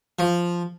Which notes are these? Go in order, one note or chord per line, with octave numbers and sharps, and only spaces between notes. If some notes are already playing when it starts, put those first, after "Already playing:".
F3